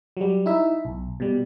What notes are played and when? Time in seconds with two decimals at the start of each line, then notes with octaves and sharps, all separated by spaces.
0.17 F#3 G3
0.46 D#4 E4 E5
0.85 B1
1.20 B2 G3